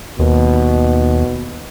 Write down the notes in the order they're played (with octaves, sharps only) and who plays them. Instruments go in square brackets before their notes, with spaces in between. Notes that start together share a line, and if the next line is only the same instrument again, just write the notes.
[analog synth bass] D#2 [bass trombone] B2